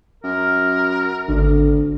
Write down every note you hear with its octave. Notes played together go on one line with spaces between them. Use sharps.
F#2 A#4
G#1 D2 D3